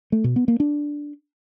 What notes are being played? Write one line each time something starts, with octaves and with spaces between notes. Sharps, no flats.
A3
B2
B3
A#3
D4